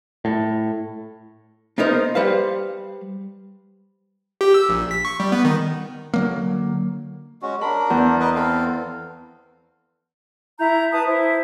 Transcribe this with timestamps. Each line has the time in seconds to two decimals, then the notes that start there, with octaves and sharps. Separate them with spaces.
0.25 A2
1.78 A#3 B3 D#4 A#4 C5
2.15 G3 B4 C5 F5
4.41 G4
4.54 E6
4.69 A#1
4.91 B6
5.05 C#6
5.20 G3
5.32 B3
5.45 D#3
6.14 D3 F#3 A#3
7.42 G#3 C#4 F#4
7.61 D4 A#4 B5
7.90 E2
8.20 A#4 B4 D#5
8.35 C4 A4 F5
10.58 E4 A#5 G6
10.91 B4 A5 D#6
11.06 E4 C5